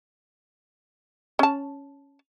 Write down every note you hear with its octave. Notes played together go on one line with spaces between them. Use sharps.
C#4 A5